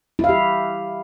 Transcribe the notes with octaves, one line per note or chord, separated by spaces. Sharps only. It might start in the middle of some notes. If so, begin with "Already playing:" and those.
E4 G4 F5